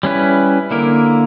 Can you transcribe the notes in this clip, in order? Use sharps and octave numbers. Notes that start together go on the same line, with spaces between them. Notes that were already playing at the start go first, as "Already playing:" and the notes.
G3 C#4 E4 B4
D3 A#3 E4 A#4